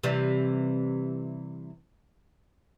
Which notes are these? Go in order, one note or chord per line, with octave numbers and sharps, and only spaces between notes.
C3 E3 G3